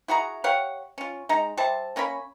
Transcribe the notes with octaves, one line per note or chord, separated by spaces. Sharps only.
E4 F#4 G#4 A#5
G4 C#5 F5 F#5
C#4 F4
G#3 D#4 A#5
G3 C5 E5 A5
A#3 C#4 A#4 B5